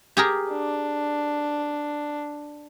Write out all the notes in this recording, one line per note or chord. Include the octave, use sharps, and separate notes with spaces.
G4 G#4 A#4
D4